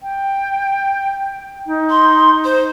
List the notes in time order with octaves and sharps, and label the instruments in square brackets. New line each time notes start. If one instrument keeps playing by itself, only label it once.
[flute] G5
D#4
[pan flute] C6
C5